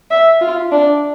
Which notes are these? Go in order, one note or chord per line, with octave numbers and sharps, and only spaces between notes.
E5
F4
D4